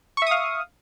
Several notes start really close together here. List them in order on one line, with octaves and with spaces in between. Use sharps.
C#6 E5 D#6 F5